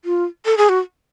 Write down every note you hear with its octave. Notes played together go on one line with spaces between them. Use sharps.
F4
A4
G#4
F#4